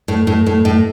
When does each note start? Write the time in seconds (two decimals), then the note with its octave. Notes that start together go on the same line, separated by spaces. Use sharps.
0.08 A2
0.27 A2
0.47 A2
0.65 A2